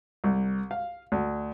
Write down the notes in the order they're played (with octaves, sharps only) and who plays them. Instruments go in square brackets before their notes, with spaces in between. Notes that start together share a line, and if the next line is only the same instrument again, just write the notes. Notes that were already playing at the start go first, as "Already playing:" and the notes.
[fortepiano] C2
F5
D2